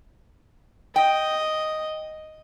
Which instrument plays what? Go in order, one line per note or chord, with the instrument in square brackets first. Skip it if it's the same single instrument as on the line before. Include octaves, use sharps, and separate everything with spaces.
[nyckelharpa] D#5 [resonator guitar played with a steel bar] G5